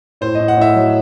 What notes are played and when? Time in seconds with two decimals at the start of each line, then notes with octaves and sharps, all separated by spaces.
0.21 A2 C5
0.35 A2 D#5
0.48 F#5
0.56 A2
0.61 E5
0.74 F#3